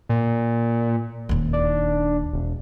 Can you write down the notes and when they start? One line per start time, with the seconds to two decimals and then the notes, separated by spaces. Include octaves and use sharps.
0.09 A#2
1.29 D#1 D#2
1.53 D4
2.33 E1